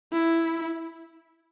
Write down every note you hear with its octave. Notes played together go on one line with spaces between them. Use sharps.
E4